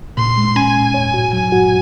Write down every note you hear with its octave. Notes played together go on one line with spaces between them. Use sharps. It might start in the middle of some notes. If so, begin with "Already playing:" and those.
A#2 C6
G#3
C#4 G#5
A#2
C#5
F#4
F#3 G#5
F#4